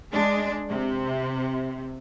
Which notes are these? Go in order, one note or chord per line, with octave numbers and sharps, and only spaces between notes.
G#3 D4
C3